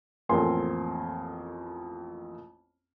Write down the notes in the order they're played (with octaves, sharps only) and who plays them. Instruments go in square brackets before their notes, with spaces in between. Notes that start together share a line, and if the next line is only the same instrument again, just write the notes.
[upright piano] A1 F2 A#3 C4 G#5 C6